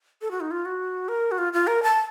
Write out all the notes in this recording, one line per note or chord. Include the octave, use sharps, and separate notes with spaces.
A4
F#4
D#4
F4
F#4
A#4
F#4
F4
F4
A#4
A5